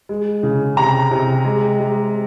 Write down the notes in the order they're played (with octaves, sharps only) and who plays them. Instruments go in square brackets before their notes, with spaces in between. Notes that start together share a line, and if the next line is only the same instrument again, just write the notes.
[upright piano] G#3
C#3
C3 A#5
C3
G#3
G#3